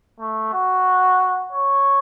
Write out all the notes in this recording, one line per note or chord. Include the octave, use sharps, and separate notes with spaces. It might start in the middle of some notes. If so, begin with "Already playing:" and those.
A3
F#4
C#5